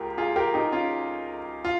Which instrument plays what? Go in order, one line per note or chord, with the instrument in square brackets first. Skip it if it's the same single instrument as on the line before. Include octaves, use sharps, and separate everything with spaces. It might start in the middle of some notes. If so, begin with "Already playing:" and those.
Already playing: [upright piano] C#2 F4 G4 G#4 A#4
F4 G#4
G4 A#4
D#4 G4
C#4 F4
F4